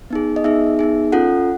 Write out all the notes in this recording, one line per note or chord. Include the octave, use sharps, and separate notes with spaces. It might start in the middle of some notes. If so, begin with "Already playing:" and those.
B3 D#4 G#4
D#5
B3 D#4 G#4 E5
B3 D#4 G#4
C#4 F4 A4 F#5